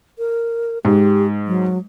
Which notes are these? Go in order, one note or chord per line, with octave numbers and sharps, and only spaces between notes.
A#4
G#2 G4
F#3